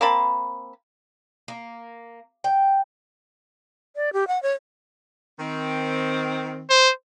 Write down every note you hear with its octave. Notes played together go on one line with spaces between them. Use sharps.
A#3 C4 A5 B5
A#3
G5
D5
G4
F#5
C#5
D#3 C4
C5